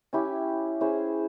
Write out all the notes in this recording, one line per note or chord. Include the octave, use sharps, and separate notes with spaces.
C#4 E4 G4
C#4 E4 G#4 C5